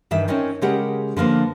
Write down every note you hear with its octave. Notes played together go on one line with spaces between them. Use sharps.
G2 D#3 E3 E5
C4 C#4 D#4 A#4 C#5
C#3 G#3 G4 A#4 F#5
D3 F3 A#3 B3